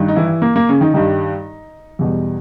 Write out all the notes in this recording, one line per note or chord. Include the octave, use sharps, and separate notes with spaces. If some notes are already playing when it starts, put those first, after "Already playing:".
Already playing: G2 D#3
D#4
E3 E4
A#3
A#3
C#3 C#4
D#3 D#4
G2 D#3 G3 D#4
E2 B2 G3